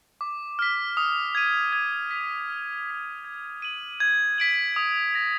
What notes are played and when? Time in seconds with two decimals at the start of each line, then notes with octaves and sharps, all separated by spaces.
0.21 D6
0.59 F6 B6
0.97 D#6
1.35 G#6 D#7
1.73 G#6
2.11 B6 F7
2.48 F6
2.86 B6 F7
3.24 G#6
3.62 D#7 F#7
4.00 G#6
4.38 B6 D7 F#7
4.76 D#6
5.14 A#6 D7